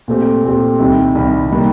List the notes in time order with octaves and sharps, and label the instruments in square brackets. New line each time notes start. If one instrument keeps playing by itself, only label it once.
[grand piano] A#2 A3 C4 G4
A#2 A3 C4 G4
C2 C3 D#3 G3
C2 C3 D#3 G3
D#3 G3 A#3